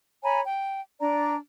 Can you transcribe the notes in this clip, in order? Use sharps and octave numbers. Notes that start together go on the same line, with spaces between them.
C#5 G#5 A#5 B5
G5
D4 D5 A#5